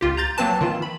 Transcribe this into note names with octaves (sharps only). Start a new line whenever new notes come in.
C#2 F4 G4
A#5 G6 A6
F#3 A#3 C4 B4 A5
D#3 E3 F4
B5